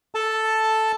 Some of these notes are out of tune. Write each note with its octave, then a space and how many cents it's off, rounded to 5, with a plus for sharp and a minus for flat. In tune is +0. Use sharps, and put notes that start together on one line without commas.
A4 +0 A5 +0